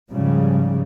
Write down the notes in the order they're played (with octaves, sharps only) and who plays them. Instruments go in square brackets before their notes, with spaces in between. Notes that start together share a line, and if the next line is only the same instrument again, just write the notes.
[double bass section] G#2 C#3 F3 G3